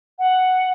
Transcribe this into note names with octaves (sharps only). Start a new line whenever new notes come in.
F#5